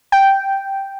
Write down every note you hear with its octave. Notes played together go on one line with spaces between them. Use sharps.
G5